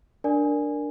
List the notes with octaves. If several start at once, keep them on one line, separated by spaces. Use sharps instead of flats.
D4 A#4 D5 G#5